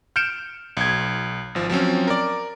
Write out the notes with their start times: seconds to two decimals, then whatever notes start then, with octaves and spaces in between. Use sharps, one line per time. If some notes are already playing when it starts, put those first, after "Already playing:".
0.16 F6 G6 C#7 D7 E7
0.77 B1 G#6
1.55 G#1 F3
1.70 F3 F#3 C4 C#4
2.07 A#4 D5